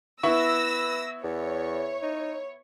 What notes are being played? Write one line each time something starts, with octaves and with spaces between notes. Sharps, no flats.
B3 E4 B4 C#6 E6 A#6
E2 C#5
D#4